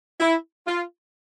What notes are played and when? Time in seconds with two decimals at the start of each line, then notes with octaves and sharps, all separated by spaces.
0.20 E4
0.67 F4